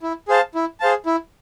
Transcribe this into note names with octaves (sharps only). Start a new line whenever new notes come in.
E4
G#4 C5 F5 A5
E4
G#4 C5 F5 A5
E4